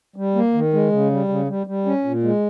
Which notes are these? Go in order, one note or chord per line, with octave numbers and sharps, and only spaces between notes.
G3
A#3
D#3
G#3
C#3
G3
C#3
G3
G3
C#4
A#2
G#3